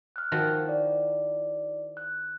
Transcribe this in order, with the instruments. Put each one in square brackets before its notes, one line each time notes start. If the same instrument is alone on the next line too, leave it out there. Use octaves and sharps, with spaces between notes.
[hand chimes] F6 F#6
[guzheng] D#3 F3 F#4
[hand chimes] E4 D5
F#6